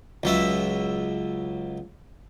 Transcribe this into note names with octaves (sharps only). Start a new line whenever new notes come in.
C#2 F#3 E5